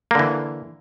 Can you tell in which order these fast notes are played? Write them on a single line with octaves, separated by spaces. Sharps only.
A#3 D3 E3